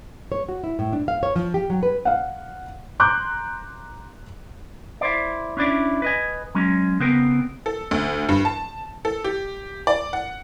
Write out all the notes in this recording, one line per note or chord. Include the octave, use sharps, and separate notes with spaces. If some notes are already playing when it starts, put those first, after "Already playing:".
C#5
F#4
E4
A2
D4
F5
C#5
F3
G4
F#3
B4
F5 F#5
A#5 C6 D6 F#6 G6
E4 C5 D5
C#4 D4 E4 D5
B4 D#5 G#5
F#3 G#3 C#4
C#3 B3 C4 A#4
A4
D2
G2
A5
A4
G4
D5
F#5